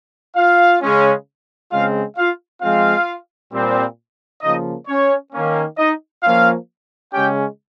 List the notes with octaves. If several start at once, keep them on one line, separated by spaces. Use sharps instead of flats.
F4 F5
C#3 G#3 C#4
C#3 G#3 C4 F4 F5
F4 F5
F3 G#3 C4 F4 F5
A#2 G3 C4
C#3 F3 A#3 D#4 D#5
C#4 C#5
D#3 A#3 C#4
D#4 D#5
F3 A#3 C#4 F4 F5
C#3 G#3 C#4 G4 G5